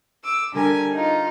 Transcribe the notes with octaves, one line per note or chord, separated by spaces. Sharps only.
D6 E6
D3 G3 A#4 G#5
D#4 F4